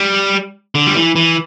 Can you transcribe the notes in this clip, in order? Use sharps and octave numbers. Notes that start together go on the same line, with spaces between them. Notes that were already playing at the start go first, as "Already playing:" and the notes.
Already playing: G3
D3
G3
E3
E3